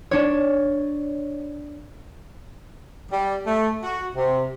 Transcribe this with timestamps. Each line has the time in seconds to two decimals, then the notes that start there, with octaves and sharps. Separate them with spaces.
0.11 D4 C#5
3.12 G3
3.47 A3
3.83 F#4
4.16 C3